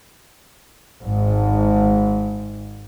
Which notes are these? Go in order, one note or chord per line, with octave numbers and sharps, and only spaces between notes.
G#1 G#2